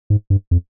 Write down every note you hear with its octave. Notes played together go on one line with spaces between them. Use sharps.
G#2
G2
F2